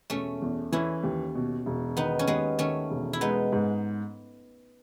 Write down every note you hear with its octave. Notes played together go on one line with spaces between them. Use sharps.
E1 A3 C#4
E2
E3 C#4 E4
D#2
B2
E1
D#3 B3 D#4
C#4
D#2 G#3 B3
D#3 A3 C#4
E1
E4
G#3 B3 D#4
G#2